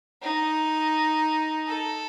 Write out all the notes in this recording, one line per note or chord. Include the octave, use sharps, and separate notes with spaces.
D#4
A4